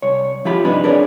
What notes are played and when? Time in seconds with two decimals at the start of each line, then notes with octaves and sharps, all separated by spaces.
0.02 C2 C#5
0.45 F3 E4 F4 G4 B5
0.64 G2 C3 D4 D#4 B4 B5
0.84 D4 G#4 A#4 B4 C#5 D5